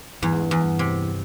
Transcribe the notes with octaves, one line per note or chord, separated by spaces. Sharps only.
E2 G2
G#2
G2
E2
G2
C3